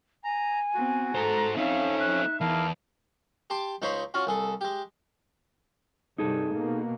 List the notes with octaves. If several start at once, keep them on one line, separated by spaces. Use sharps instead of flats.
G#5 A#5
B3 C4 F#4
G#2 A4 C5 A#5
C4 C#4 D#4 A4 E5 F5
F#6
E2 E4 A#4 F5 A5
G4 A5 C6 D6
C#2 D#4 C5 C#5 B5 C6
C#4 F4 F#4
C2 G#4 A4
G#3 G4
G2 C3 D#4 G#4 A4
B2 A#3